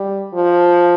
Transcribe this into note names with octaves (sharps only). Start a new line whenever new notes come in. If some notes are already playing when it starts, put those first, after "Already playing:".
Already playing: G3
F3